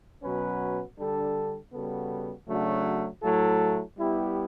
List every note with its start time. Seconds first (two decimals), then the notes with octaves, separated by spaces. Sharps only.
0.22 B2 F#3 C#4 F#4 B4
0.97 D3 G3 D4 A4
1.72 C#3 G3 B3 F#4 A4
2.47 C#3 F#3 A3 D4 F#4
3.22 A2 F#3 A3 E4 A4
3.97 G3 B3 E4 G4